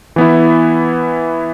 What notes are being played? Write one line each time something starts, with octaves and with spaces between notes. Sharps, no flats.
E3 B3 E4